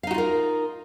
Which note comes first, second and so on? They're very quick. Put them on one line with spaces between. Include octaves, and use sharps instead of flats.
F5 D#4 F#4 F4 A#4